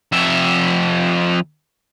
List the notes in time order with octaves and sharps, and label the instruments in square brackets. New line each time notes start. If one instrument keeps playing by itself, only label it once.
[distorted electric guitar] F2 E5